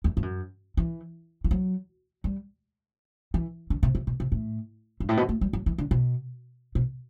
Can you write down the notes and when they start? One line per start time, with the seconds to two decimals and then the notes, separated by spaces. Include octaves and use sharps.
0.04 E2
0.17 G2
0.23 F#2
0.77 E3
1.44 E3
1.51 F#3
2.24 G3
3.34 E3
3.70 D3
3.83 C3
3.95 C3
4.07 B2
4.20 C3
4.32 A2
5.00 G2
5.09 A2
5.17 B2
5.29 A3
5.41 G3
5.53 F#3
5.66 E3
5.78 D3
5.91 B2
6.75 B2